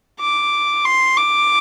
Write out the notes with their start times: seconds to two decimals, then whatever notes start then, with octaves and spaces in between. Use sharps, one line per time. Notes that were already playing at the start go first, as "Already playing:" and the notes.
0.20 D6
0.85 C6
1.17 D6